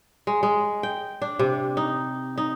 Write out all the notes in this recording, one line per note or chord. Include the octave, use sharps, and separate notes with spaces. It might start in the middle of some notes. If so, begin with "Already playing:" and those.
G#3
G#3
G5
D4
C3
D#4
D#4